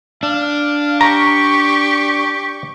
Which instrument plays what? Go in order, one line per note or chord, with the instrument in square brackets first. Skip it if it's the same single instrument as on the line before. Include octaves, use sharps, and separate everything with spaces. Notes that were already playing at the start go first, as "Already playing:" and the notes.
[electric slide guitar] D4 [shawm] F5
[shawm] G4 [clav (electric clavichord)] A#5 [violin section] C#6